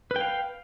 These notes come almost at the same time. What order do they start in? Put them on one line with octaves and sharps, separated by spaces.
B4 G5 F5